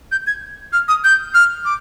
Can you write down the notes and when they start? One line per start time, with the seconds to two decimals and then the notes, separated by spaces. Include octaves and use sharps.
0.12 G6
0.27 G#6
0.73 F6
0.88 D#6
1.04 G6
1.34 F6
1.65 D6